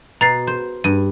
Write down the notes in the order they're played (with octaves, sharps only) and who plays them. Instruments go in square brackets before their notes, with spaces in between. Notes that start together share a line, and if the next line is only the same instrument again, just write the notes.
[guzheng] B2 [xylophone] A#5 A6 C7
[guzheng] C5
[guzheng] G2 [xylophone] D#7